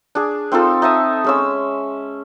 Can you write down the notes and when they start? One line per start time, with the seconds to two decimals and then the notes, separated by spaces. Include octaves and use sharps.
0.15 D4 G#4
0.52 C4 D#4 F4 A4
0.82 D#4 E5 A5 D#6
1.24 G#3 C#4 E6